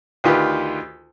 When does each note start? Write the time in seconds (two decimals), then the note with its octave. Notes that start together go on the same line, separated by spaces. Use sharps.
0.24 D2 D#3 F4 G4 B4